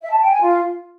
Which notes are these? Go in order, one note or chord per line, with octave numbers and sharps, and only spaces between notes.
E5
A5
G5
G#5
F4